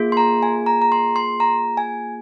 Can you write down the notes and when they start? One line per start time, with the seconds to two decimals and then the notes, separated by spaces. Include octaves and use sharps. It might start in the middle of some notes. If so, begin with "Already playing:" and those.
Already playing: A#3 F4 G#4
0.12 C6
0.17 A#5
0.43 G#5
0.66 A#5
0.82 A#5
0.92 C6
1.16 C6
1.40 A#5
1.77 G#5